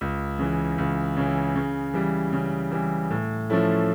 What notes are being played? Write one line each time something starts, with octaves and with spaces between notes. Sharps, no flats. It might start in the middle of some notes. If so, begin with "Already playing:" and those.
C#2
C#3 E3
C#2
C#3 E3
C#3
E3 G3
C#3
E3 G3
A2
F3 A3 C#4 E4